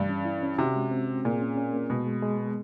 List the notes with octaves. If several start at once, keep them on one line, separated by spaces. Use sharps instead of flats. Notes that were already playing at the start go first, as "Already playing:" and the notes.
Already playing: G2 E3
C#4
E4
C#4
C3 F#4
G#3
C4
C4
A#2 G#4
C#4
C#4
A#3
B2 G#3
G#3
G#3
B3